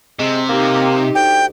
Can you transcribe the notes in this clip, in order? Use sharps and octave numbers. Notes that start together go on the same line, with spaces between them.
C3 G#3
A#3 D#4 G4
D2 G5